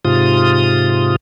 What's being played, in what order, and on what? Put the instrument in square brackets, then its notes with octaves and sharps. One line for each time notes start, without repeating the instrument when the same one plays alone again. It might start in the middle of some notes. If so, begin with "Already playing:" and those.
[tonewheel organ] G#2 C3 F4 D#6